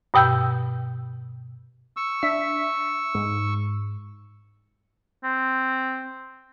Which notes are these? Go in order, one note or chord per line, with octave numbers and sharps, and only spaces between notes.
G2 B2 G5 E6 G6
C#6 E6
D4 E5 B6
G#2
C4